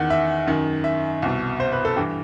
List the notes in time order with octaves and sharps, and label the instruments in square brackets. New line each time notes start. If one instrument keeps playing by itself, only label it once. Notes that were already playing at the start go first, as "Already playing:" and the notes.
Already playing: [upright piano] E2 D#3 F#5
E5
F#2 D#3
E5
C2 B2
C5
B4
A4
G2 E3 G4